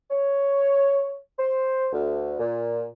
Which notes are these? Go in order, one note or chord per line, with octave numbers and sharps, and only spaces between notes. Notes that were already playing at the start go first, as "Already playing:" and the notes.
C#5
C5
D2
A#2